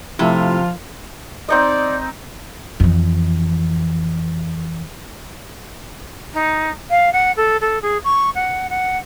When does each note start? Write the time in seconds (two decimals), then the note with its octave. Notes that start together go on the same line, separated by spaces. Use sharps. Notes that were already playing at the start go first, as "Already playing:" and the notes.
0.19 C3 F3 A3 E4 F4
1.49 C4 D#4 D5 D#5
2.80 F2 E3
6.34 D#4
6.90 F5
7.13 F#5
7.37 A4
7.61 A4
7.82 G#4
8.04 C#6
8.35 F#5
8.70 F#5